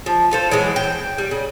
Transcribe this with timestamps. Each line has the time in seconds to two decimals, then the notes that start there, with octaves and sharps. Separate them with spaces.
0.06 F3
0.31 F4 A4 C5
0.51 E3 F#3 G#3
0.76 G5
1.18 G3
1.31 C#3